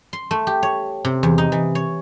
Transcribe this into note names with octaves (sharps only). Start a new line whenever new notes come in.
C6
A3
G4
C#5
C3
E2
D#4
E3
C#5